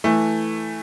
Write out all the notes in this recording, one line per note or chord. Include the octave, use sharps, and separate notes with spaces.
E3 A3